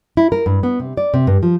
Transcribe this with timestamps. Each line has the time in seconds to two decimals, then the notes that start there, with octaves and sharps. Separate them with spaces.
0.17 E4
0.32 A#4
0.46 G2
0.63 B3
0.80 C3
0.97 D5
1.14 C3
1.27 G2
1.43 F3